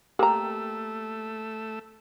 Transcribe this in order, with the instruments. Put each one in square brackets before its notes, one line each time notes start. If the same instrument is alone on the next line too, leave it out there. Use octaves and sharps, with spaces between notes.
[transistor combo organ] A3 E6 [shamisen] A#3 A#5 [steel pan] G4